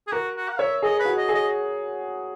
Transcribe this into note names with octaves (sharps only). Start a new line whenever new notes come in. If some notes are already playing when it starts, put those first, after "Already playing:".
G#4
F#4 A#4
F#4
F#5
C#5 E5
G#4 D#5
B4
F#4
D#5
G#4
D#5